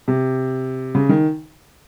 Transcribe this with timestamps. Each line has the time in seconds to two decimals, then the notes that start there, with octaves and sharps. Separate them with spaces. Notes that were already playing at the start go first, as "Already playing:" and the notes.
0.08 C3
0.95 C#3
1.09 D#3